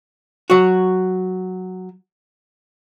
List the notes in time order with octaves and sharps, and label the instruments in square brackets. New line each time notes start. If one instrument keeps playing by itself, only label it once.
[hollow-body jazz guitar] F#3 F#4